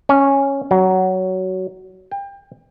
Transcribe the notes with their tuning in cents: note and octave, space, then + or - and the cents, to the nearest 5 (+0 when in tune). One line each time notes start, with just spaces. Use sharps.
C#4 -5
F#3 +15
G5 +30